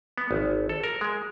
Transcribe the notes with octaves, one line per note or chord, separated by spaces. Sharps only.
B3
G#1
A4
A#4
G#3